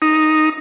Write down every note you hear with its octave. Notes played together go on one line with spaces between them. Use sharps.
D#4